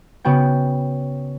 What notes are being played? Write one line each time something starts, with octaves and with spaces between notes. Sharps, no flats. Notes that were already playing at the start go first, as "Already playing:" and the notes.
C#3 B3 F#4 G5